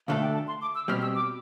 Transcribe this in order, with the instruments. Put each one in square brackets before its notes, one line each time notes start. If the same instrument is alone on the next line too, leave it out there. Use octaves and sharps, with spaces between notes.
[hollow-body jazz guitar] D2 D3 A3 D4 A4 [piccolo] F5
[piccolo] G5
A5
C6
D6
E6
[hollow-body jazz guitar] B2 G3 C4 G4 [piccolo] F6
[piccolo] E6
D6